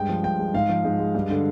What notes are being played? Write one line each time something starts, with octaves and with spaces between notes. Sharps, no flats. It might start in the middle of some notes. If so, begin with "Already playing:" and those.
Already playing: G2 G#3 G5
F3
G2 G5
G#3
G#2 F5
F3
G#2
G#3
G2
D3